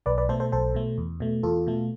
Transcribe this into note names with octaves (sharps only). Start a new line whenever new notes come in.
B1 B4 D5
B4 D5
B2 A3 A4 C5
A4 C5
B1 A4 C5
B2 A3
E2
B2 A3
E2 F4 A4
B2 A3